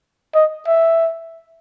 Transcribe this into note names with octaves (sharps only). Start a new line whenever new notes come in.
D#5
E5